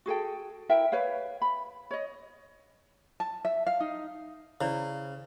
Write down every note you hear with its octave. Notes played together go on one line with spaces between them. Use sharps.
F#4 G#4 A4 G5
E4 A#4 E5 G5
B4 C#5 F5
B5
C#5 D#5
A5
E5
F5
D#4
C#3 E4 C5 D5